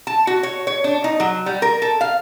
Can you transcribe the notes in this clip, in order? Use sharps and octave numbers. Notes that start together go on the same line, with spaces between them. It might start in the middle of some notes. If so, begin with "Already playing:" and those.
A5
F#4
C#5
C#5
D4
D#4
F#3
G3
A#4
A4
F5